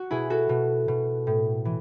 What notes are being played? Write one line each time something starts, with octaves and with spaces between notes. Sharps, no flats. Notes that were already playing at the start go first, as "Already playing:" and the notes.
Already playing: F#4
B2 E4 G#4
F#4 A4
B2
B2
A2
E3